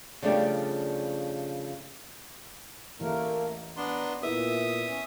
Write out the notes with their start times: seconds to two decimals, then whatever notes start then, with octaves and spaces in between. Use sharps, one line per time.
0.22 C#3 F3 G3 A3 D4 G4
3.00 A1 A3 A#3 A#4
3.77 B3 D4 A#5 C6
4.23 A#2 B3 E4 E5 D#6
4.86 C#4